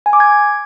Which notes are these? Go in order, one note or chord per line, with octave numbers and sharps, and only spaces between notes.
G#5
D6
G#6